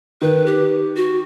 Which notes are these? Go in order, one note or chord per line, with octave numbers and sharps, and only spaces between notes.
D#3 B4
G4
F#4